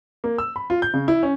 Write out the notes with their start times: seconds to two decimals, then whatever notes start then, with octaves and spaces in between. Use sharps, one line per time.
0.24 A#3
0.38 E6
0.56 B5
0.70 F4
0.82 G6
0.94 C#3
1.08 E4
1.23 C#4